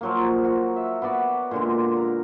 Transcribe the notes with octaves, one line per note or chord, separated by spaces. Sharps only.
F3 F#3 A#3
F#4
E5
B3 F#4 D5 B5
A#2 D3 G#3
A#4